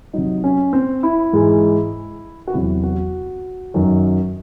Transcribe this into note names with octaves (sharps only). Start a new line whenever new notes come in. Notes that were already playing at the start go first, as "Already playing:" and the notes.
C3 F#3 D#4
C#4
C4
E4
G#2 E3 G#3
F#4
E2 C3 F#3 E4
F#4
F#2 D#3 F#3